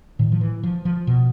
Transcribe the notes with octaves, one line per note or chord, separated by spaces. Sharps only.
A2 D#3
F3
E3
F3
F3
B2